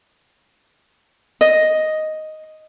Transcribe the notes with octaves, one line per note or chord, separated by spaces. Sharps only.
D#5